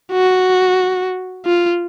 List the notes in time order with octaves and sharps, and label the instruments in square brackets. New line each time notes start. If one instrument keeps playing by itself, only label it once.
[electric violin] F#4
F4